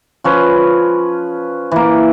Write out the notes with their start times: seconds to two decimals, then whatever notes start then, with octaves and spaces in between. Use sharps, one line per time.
0.24 F3 C#4 B4
1.71 E3 A#3